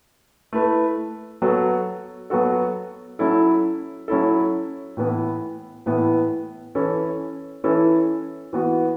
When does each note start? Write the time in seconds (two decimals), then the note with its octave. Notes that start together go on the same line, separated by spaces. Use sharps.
0.53 A3 E4 B4
1.42 F#3 B3 F#4 A4
2.30 F#3 B3 F#4 A4
3.19 F#3 C#4 E4 A4
4.08 F#3 C#4 E4 A4
4.97 A2 E3 B3 E4
5.86 A2 E3 B3 E4
6.75 E3 C#4 E4 A4
7.64 E3 C#4 E4 A4
8.53 E3 B3 F#4